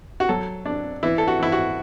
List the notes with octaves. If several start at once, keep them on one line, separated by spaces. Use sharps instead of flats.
F#4
F#3 A4
D4
E3 E4
A4
F#4
E3 E4
F#4